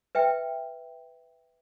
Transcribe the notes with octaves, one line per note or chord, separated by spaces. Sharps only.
B4 E5 G5